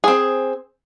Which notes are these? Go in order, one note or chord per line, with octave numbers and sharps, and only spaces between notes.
C4 G#4